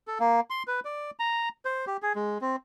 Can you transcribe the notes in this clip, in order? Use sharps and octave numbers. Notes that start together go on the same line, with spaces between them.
A4
A#3
C6
B4
D5
A#5
C5
G4
G#4
G#3
C4